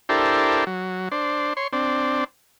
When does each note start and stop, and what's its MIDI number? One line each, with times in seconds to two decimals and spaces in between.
0.09 0.64 62
0.09 0.64 64
0.09 0.64 67
0.09 0.64 69
0.09 0.64 70
0.09 0.64 72
0.67 1.09 54
1.11 1.53 62
1.11 1.53 72
1.57 1.68 73
1.57 1.68 84
1.73 2.24 60
1.73 2.24 62